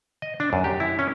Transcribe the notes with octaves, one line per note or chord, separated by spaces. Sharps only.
D#5
D4
F#2
G4
E4
C#4